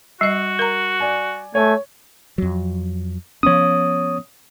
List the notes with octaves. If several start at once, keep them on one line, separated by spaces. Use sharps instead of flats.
G3 F#4 D#5
A#4 A#5
D5 G#5
A3 C#5 G#5
F2 F#3
F3 B3 C#4 C#5 D#6